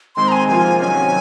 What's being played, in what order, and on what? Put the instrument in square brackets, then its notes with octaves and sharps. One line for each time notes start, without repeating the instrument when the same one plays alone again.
[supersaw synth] D#3 G#3 C4 [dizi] C6
[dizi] A#5
G#5
[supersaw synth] C3 F3 A#3 F4 [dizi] G#5
[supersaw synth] C3 D#3 F#3 C#4 [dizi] G#5